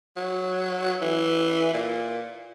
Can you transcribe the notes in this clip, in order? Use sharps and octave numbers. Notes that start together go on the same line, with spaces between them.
F#3
E3
A#2